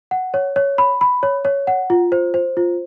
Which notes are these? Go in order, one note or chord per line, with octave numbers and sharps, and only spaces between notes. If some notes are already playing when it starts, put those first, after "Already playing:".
F#5
C#5
C#5
B5
B5
C#5
C#5
F#5
F4
C5
C5
F4